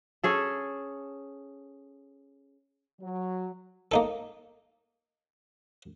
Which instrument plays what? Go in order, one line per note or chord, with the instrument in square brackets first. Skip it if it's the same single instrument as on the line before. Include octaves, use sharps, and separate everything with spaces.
[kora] C#4 G#4 A4
[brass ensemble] F#3
[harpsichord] A#3 D#4 A4